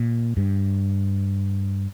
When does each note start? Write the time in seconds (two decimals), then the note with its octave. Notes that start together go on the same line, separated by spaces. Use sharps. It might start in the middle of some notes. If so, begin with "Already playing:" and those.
Already playing: A#2
0.37 G2